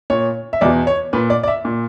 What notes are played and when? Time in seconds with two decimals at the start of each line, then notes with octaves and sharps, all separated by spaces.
0.10 A#2 C#5
0.53 E5
0.61 E2 B2 D5
0.87 C#5
1.13 A#2 B4
1.30 D5
1.43 D5
1.48 E5
1.65 A#2